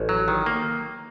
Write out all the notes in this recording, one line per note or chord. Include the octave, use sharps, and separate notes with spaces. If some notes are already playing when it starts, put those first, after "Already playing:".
Already playing: A1
F#3
D#3
A#3